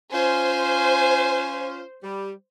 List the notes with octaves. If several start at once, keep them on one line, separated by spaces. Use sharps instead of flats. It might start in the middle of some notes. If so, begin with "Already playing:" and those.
C#4 F4 C5 G#5
G3